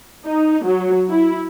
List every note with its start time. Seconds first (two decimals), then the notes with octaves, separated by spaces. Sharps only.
0.25 D#4
0.64 F#3
1.10 E4